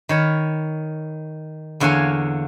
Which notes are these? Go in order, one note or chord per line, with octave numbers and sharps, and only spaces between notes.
D#3 C#5 B5
E2 D3 A#3 C#5 F5 G#5